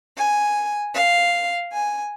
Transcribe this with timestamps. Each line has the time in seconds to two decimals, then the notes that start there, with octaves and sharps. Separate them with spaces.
0.16 G#5
0.93 F5
1.72 G#5